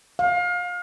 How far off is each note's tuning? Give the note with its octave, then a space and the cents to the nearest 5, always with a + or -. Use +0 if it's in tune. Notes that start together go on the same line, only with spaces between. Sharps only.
F5 +30